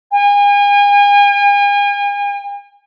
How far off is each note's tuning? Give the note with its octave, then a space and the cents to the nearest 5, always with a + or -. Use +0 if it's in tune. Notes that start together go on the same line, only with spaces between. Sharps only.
G#5 -40